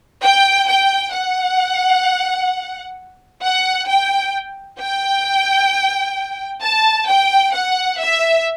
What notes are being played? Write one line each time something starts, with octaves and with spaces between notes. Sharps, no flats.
G5
G5
F#5
F#5
G5
G5
A5
G5
F#5
E5